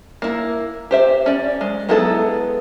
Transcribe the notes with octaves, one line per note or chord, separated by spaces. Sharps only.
A#3 E4
G4 C5 E5
C#4 D5
G#3
F#3 G#3 B3 E4 A4